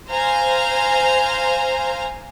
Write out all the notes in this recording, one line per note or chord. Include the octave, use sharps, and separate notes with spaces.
C5 F5 G#5 A#5